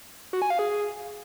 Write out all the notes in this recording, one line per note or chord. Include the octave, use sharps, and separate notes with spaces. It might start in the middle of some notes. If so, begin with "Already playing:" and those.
F#4
G#5
F5
G#4